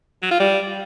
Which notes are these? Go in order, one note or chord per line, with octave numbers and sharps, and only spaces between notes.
F#3
F4
G3